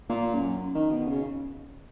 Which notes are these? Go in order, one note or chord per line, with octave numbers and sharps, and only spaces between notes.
A#2
F#2
D#3
B2
C#3